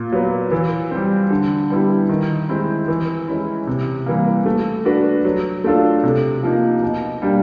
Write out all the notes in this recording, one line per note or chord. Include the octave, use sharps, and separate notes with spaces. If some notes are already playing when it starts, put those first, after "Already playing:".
Already playing: A#2
F#3 B3
E3
G3 C4
D3
G3 B3 E4 G4
D#3
G#3 C4 E4
E3
G#3 C#4 E4
C3
E3 G3 A#3
A3
D4 F#4 B4
F#3
A3 D4 F4 A4
C3
F3 A#3 D#4
B2
G3 A#3 D4 G4